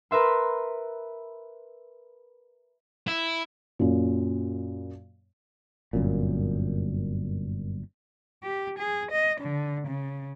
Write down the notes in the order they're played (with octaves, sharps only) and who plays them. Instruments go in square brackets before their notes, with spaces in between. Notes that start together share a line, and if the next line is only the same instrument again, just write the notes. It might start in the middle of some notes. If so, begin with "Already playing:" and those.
[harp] A#4 B4 E5 C6
[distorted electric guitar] E4
[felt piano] F#2 A#2
[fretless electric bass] G1 F#2 A#2
[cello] G4
G#4
D#5
D3
C#3